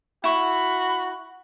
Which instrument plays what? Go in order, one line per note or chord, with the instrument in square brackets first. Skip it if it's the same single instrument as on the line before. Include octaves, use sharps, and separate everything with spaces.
[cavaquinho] E4 C#6 [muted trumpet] F#4 [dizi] B5